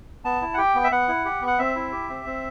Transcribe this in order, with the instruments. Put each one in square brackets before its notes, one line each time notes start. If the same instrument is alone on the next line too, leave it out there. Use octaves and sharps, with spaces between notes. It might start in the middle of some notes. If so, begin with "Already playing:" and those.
[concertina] B3 A5
E4
F#5
G4 G5
B3
E5
B3 F#5
E4
G4
B3
F#5
C4 E5
E4
G4
C4
C4